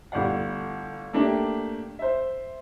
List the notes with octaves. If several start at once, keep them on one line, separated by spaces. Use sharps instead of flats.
G1 A2 G3 D5 F5 F#5
A3 A#3 D4 G4
C5 E5